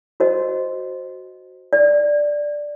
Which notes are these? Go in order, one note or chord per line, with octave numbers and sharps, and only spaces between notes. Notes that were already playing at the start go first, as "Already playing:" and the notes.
F#4 C5 D#5
D5